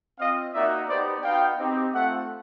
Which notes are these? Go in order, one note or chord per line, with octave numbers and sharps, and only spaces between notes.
C4 F4 D#5 F5
A#3 D#4 F#4 D5 E5
B3 D#4 G4 C5 D5
B3 D#4 F#4 F5 G5
C4 D#4 G4
A3 C4 F4 E5 F#5